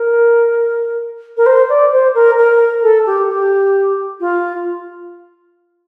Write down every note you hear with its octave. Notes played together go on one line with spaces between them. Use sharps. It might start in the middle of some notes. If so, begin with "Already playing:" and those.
Already playing: A#4
A#4
C5
D5
C5
A#4
A#4
A4
G4
G4
F4